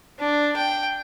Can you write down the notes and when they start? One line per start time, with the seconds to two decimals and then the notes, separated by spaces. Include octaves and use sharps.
0.19 D4
0.56 G5